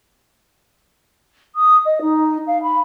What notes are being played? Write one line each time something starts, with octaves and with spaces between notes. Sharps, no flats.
D#6
D#5
D#4
F5
B5